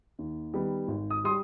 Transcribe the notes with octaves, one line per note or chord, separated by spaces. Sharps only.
D#2
D#3 G3 B3
G#1
D#6
G3 C6 D#6